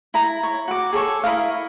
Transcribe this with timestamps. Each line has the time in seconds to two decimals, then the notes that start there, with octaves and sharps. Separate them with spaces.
0.14 E4 A#5
0.43 C#5
0.68 F#4 D6
0.93 G#4 A4 C#5 C#6
1.24 E4 A#4 D#5 F5